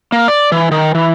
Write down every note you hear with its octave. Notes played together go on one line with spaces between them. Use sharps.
A#3
D5
E3
D#3
E3